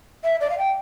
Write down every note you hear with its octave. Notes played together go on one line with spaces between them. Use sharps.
E5
D5
F5
G5